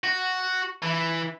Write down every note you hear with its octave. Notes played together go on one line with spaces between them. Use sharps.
F#4
E3